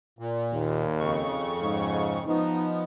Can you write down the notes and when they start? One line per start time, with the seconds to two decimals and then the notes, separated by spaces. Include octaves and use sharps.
0.19 A#2
0.53 D#2
1.00 F2 C#3 C#6
1.62 G#2
2.27 F3 B3 D#4